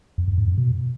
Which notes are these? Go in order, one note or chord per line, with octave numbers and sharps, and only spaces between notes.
F2
F#2
G#2
F#2
B2